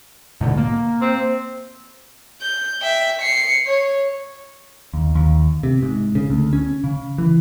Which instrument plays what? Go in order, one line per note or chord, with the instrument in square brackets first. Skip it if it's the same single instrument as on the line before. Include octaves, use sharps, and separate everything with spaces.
[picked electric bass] G#2 B2 D3
A#3
[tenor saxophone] C4
[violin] G6
E5 G5
C7 C#7
C#5
[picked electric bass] D#2
D#2
C3
G#2
C#3
D2
C#4
C#3
E3